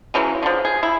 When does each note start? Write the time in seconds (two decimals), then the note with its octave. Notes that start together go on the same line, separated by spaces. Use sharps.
0.14 C#3 E3 F#3 G#3
0.43 D3 F3
0.65 G#4
0.83 E4